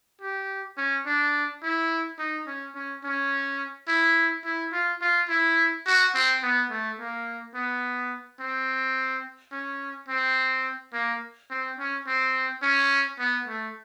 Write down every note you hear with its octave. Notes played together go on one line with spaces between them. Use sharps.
G4
C#4
D4
E4
D#4
C#4
C#4
C#4
E4
E4
F4
F4
E4
F#4
C4
B3
A3
A#3
B3
C4
C#4
C4
A#3
C4
C#4
C4
C#4
B3
A3